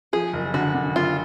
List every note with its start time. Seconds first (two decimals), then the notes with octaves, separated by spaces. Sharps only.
0.13 F3 G#4
0.33 F#1
0.54 D3 F#4
0.74 D3
0.96 F#1 F4